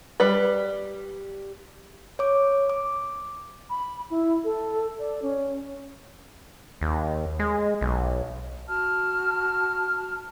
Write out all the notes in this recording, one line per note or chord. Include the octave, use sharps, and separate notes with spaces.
G3 B4
C#5 D6
D6
B5
E4
A4
D5
C#4
D#2
G#3
B1
F#4 A5 F6